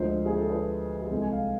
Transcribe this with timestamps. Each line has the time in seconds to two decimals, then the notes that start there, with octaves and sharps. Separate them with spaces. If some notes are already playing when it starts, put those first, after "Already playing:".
Already playing: D2 D3 F3 G#3 C5
0.26 G#4
0.38 A4
0.50 B4
1.02 G#4
1.11 C2 C3 G#3 A4
1.22 G#5
1.32 F5